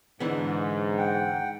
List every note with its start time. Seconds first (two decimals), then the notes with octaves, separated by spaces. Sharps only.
0.20 G#2 D3 E3 B3
0.98 F#5 G5